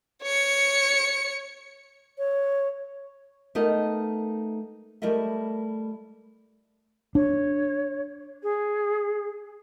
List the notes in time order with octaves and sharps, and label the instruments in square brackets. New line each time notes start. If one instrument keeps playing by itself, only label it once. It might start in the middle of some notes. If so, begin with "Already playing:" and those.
[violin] C#5 C#7
[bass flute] C#5
[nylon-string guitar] A3 B3 D#4 A#4 D#5
G3 A3 E4 A#4 D#5 E5
[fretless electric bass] D4 [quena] C#5
[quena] G#4